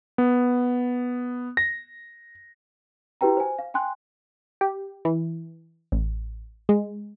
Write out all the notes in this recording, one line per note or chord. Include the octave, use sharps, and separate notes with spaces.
B3
A#6
E4 F#4 G4 B4 G5 A#5
C5 G#5
F5
G5 G#5 C6 F#6
G4
E3
A1
G#3